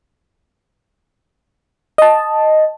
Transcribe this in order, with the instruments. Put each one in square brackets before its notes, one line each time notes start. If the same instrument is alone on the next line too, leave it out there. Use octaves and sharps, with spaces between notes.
[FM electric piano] D#5 A5